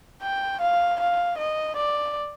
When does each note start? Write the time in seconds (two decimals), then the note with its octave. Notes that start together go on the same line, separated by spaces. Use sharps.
0.23 G5
0.61 F5
1.00 F5
1.38 D#5
1.76 D5